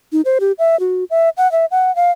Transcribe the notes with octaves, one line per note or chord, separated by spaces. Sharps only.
D#4
C5
G4
E5
F#4
E5
F#5
E5
F#5
F5